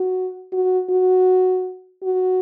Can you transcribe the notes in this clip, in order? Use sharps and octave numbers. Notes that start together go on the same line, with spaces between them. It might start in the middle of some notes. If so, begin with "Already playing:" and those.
Already playing: F#4
F#4
F#4
F#4